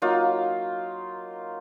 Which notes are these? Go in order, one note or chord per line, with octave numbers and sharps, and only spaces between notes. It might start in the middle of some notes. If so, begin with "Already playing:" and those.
F#3 A#3 D#4 F4